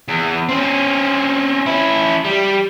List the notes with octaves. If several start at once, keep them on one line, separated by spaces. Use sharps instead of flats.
E2
C4 C#4
C#4 E4
G3